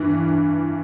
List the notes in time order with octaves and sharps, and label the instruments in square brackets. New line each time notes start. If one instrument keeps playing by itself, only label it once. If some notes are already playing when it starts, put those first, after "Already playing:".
Already playing: [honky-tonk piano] G2 E3